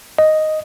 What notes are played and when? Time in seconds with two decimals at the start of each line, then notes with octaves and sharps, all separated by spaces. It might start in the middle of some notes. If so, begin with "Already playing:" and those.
0.19 D#5